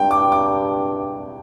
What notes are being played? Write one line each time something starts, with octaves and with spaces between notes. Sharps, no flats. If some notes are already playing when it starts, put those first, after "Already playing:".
Already playing: G2 G5
D6
D6